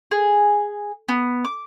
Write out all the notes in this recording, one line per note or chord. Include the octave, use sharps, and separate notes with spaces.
G#4
B3
D6